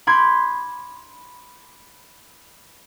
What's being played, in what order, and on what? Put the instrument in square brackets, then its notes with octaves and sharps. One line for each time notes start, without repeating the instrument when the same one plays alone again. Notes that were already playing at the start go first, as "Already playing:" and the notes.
[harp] B5 C6 D6 G6 G#6